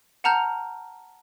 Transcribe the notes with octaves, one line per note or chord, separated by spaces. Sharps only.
F#5 A5 A#5 F6 G6 F7